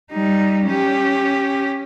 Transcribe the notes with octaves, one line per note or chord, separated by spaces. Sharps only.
G3 D#4
C#4 G4